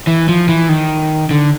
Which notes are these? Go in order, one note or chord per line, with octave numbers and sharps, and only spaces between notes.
E3
F3
E3
D#3
D3